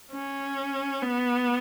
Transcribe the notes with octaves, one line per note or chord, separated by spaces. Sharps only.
C#4
B3